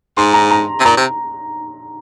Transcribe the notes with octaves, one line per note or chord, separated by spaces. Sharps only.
G#2 C6
A#5
A#5
C3
A#2 A#5
C3